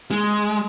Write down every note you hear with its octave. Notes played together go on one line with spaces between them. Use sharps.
G#3